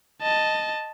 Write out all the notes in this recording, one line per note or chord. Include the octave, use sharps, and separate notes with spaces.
D#5 A5